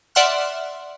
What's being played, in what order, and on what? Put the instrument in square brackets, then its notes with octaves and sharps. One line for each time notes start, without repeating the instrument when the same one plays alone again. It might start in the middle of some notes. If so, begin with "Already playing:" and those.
[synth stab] D5 E5 F#5 C6 F6 F#6